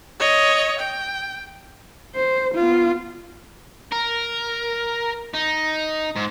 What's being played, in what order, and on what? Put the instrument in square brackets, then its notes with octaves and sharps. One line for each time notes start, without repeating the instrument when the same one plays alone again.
[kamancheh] C#5 D#5
G5
[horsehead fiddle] C5
B3 F4
[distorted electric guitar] A#4
D#4
G#2